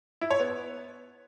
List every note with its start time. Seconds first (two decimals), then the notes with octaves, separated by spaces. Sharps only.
0.21 E4
0.30 C#5
0.40 B3